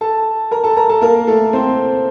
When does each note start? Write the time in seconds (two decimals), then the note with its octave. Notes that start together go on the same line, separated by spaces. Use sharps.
0.01 A4 A5
0.51 A#4 A#5
0.64 A4 A5
0.77 A#4 A#5
0.90 A4 A5
1.01 A#3 A#4
1.27 A3 A4
1.53 C4 C5